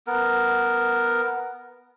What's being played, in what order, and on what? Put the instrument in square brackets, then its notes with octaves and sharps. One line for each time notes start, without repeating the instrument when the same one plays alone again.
[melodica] B3 A#4